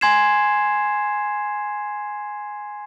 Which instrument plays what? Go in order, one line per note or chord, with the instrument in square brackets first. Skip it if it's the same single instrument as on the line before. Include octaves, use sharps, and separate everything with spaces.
[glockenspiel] G#5 C6 G#6 C7 E7